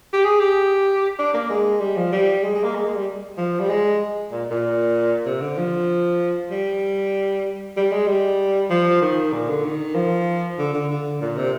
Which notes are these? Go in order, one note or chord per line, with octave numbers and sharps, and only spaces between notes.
G4
G#4
G4
D4
A#3
G#3
G3
F3
G3
G#3
G#3
A#3
G#3
G#3
G3
F3
G3
G#3
A#2
A#2
C3
D3
F3
G3
G3
G#3
G3
F3
D#3
A#2
D3
D#3
F3
D3
D3
D3
A#2
C3